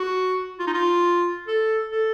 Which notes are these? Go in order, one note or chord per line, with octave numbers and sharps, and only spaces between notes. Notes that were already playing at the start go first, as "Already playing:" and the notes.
Already playing: F#4
F4
D#4
F4
A4
A4